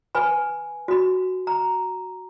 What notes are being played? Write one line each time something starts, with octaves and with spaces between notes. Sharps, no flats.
B4 G#5 B5
F#4 B5
A#5